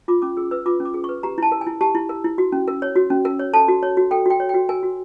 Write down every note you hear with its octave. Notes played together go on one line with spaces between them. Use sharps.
F4 D6
C#4 D6
G#4 E6
B4 E6
F4 D6
C#4
D6
G#4
B4 C#6
G4 A#5
E4 A5
A#4
G#5
E4
G4 A5
E4
A#4
E4
F#4
C#4
A#4
C#5
F#4
C#4
A#4
C#5
A4 A5
F#4
C#5
F#4
A4 G5
F#4 G5
C#5
F#4 G5
A#4 G#5
F#4